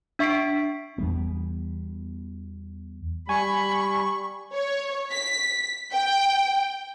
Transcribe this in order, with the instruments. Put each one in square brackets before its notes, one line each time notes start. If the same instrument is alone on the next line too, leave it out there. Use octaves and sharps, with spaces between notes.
[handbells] D4 E5 C#6 B6 C7 D7
[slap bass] E2 G3 B3
[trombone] G3 [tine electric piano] G#5 [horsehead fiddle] B5 [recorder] C#6
[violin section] C#5
B6
G5